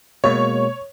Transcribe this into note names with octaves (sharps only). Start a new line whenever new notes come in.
B2 G#3 A#3 C#5